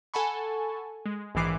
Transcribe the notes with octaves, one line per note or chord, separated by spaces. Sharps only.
A4 F#5 G#5 A5 B5 C#6
G#3
A#1 G#2 D#3 E3 D6 C7